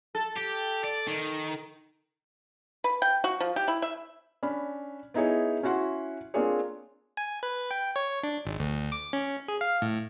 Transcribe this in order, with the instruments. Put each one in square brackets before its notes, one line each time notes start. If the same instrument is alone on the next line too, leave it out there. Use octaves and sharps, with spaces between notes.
[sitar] A4
[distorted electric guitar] G4
D5
D#3
[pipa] B4
G5
F#4
F3
G4
E4
E5
[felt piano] C#4 D4 B5
B3 D#4 E4 G#4 C#5
C#4 E4 F#4 F#5 C6
A#3 C4 D4 F4 G#4 C#5
[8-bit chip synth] G#5
B4
G5
C#5
D4
G#1
D2
D6
C#4
G#4
F5
A2